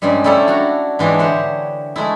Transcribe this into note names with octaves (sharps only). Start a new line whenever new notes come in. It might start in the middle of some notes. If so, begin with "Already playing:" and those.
G2 C#3 G3 G#3 B5
G3 A3 E4 A4 C#5
D4 F#4 F#5 A#5
G#2 E3 C4 D4 C#5
D3 G4 C5 C#5 F#5
G#3 A3 E4